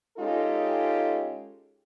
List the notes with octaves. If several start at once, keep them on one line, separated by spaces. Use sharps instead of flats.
G#3 C#4 D#4 F4 G4 A4